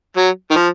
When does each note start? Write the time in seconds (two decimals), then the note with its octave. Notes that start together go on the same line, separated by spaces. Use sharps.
0.17 F#3
0.51 D#3
0.55 F3